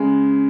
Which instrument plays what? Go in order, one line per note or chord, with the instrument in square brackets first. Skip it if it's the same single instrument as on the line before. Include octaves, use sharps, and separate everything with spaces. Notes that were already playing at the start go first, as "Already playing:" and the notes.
Already playing: [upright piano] C#3 G#3